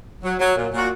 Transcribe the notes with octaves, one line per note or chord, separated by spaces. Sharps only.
F#3
F#3
A#2
A#2
F#4